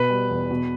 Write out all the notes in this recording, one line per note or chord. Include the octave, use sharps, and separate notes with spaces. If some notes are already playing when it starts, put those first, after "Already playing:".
Already playing: B2 B4 B5
G3
E2
B2